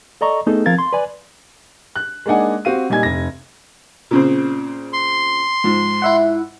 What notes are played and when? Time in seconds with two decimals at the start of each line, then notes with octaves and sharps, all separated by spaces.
0.21 A4 D5 D#5 A#5 C#6
0.47 A3 B3 D#4 G#4 A4
0.66 F3 C4 A#4 F5 G#6 A6
0.78 C6
0.93 B4 D5 G#5
1.96 F#6
2.26 G#3 A#3 D4 D#4 F#5 G#5
2.65 C4 F#4 G4 F5 D#7
2.90 A#2 G3 D#4 G#5 G#6
3.03 F1 A#6
4.11 A#2 C#3 C4
4.93 C6
5.64 G#2 F3
6.02 E4 E5 F#5